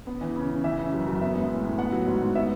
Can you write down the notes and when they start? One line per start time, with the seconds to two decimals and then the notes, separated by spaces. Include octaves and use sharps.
0.07 B3
0.21 E3
0.36 C#3
0.49 C#3
0.64 E3 E5
0.78 C#3
0.93 F#2
1.06 F#2
1.21 B3 E5
1.36 G#3
1.49 A2
1.63 A2
1.78 B3 F#5
1.92 F#3
2.06 G#2
2.21 G#2
2.35 B3 E5